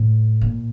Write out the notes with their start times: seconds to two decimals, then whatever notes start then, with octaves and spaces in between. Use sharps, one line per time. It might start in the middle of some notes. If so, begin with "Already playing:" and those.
Already playing: A2
0.41 A#2